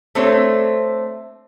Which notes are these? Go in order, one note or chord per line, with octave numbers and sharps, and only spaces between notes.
A3 C4 D4 A4 C5 C#5